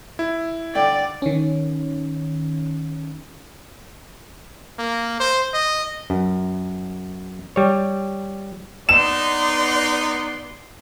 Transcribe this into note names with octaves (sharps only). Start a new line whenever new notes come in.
E4
D3 G3 D5 G5
D#3 C#4
A#3
C5
D#5
F#2
G3 C#5
B3 D#4 D5 C6 E7